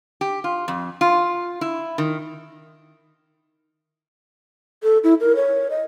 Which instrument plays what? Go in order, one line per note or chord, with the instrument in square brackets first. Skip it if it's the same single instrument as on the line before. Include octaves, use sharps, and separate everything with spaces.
[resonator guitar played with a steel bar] G4
F4
F2
F4
E4
D#3
[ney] A4
E4
A#4
C#5
D#5